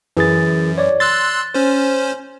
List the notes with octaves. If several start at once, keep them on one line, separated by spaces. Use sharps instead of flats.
F#2 E3 G#4 A6
C#5 D5
C6 E6 F#6 A6
C#4 C5